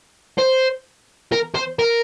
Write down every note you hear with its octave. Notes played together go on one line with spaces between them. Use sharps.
C5
A#4
C5
A#4